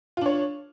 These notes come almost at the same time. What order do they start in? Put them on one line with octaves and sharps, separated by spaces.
F4 D4 C#5